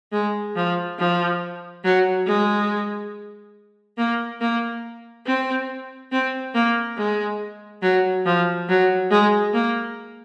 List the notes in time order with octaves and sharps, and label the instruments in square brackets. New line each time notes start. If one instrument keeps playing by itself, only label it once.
[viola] G#3
F3
F3
F#3
G#3
A#3
A#3
C4
C4
A#3
G#3
F#3
F3
F#3
G#3
A#3